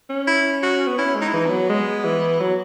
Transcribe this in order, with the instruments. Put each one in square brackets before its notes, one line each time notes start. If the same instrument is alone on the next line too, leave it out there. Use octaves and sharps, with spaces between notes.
[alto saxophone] C#4
[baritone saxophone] E4
F#4
[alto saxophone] B3
[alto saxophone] C#4 [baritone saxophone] E4
[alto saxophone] G#3
[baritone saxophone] D#4
E4
[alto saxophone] E3 [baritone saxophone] D#4
[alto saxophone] F#3 [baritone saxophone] B3
[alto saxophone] G#3
E3
F#3